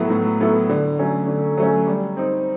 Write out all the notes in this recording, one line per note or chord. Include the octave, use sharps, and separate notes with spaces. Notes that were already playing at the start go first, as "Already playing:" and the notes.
Already playing: A2 F#3 B3 E4 A4
A2
F#3 B3 E4 A4
D3
F#3 A3 C#4
D3
F#3 A3 C#4
G3
C4 D#4